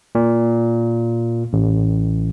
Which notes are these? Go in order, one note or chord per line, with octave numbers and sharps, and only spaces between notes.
A#2
A1